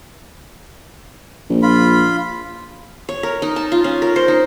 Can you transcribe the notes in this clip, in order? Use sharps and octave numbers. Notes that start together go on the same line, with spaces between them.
A#1
F4 B5
C#5
A#4
D#4
A5
F4
C#4
A#4
C5
D#4